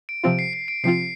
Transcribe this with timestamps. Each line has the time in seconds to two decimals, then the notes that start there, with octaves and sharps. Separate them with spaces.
0.09 D7
0.24 C3 F3 C4 F4 D7
0.39 C7
0.53 C7
0.68 D7
0.83 C3 F3 C4 F4 C7